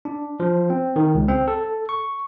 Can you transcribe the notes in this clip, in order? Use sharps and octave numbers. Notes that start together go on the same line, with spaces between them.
D4
F3
C4
D#3
C#2
C4
A4
C#6